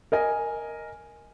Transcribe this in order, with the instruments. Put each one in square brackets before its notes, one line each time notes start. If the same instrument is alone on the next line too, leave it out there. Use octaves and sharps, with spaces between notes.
[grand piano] A#4 D#5 G#5